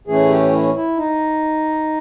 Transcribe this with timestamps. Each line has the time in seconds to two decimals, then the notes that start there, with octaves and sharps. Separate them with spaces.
0.07 A2 E3 A3 C#4 G#4
0.30 G4
0.52 E4
0.75 E4
0.97 D#4